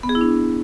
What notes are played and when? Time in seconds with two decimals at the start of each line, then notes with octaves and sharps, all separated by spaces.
0.03 B3
0.09 G#4
0.15 E4
0.21 D4